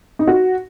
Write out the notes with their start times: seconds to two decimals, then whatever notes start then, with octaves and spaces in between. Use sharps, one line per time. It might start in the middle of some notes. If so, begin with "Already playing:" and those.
0.19 D#4
0.27 F#4